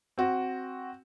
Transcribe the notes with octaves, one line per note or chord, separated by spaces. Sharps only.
C4 F#4